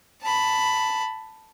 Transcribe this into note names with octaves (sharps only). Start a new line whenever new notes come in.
A5 B5